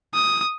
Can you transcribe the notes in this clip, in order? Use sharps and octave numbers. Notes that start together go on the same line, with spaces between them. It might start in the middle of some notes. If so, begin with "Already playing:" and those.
D#6